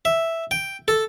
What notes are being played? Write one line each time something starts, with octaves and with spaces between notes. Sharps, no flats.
E5
G5
A4